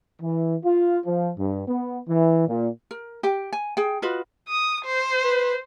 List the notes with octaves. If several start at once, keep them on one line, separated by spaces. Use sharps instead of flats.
E3
F4
F3
G2
B3
E3
A#2
A#4
G4 G5
G#5
G#4 G5
F4 F#4 B4 D#5
D#6
C5
B4